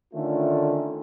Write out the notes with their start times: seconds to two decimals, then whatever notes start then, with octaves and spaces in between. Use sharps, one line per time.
0.14 D3 D#3 A3 C#4 F4